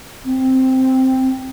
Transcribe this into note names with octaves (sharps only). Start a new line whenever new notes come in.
C4